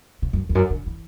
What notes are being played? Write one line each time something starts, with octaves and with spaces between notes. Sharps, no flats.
C#3
F#2
E2
F#2
D3
E3